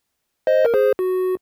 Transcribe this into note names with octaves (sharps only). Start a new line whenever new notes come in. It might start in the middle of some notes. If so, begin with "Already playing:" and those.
C5 D#5
A#4
G#4 C5
F#4